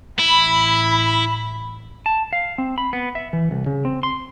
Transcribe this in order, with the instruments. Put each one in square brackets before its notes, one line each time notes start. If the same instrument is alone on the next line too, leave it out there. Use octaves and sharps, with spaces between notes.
[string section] A1 B5 [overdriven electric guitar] E4
[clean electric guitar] A5
F5
C4
B5
B3
E5
E3
C2
C#3
C4
C6